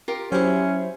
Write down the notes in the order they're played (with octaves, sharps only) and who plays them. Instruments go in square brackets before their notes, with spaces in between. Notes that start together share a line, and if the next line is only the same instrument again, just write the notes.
[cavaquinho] F4 G4 A#4
[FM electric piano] F#3 G4 C5 [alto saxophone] C#4 [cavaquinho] E4 E5